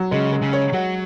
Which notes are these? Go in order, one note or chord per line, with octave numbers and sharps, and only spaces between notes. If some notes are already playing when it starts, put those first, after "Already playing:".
Already playing: F#3
C#3 G#3
G#3
C#3
C#5
F#3 F#4